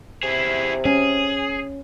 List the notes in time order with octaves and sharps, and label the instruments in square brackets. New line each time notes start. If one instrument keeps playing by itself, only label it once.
[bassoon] C3 [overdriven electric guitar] E4 G#4
[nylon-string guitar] C#4 [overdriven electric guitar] G#4